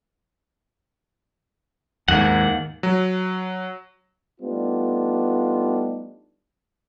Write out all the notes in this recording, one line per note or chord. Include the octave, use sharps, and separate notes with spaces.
D#2 G#2 D#3 A#3 F#5
F#3
G3 A3 B3 D4 D#4 F4